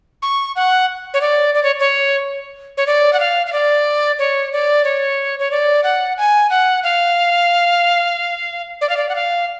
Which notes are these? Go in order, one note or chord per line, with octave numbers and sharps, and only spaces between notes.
C#6
F#5
C#5
D5
D5
C#5
C#5
C#5
D5
F#5
F5
F5
D5
C#5
D5
C#5
C#5
D5
F#5
G#5
F#5
F5
D5
F5
D5
F#5
F5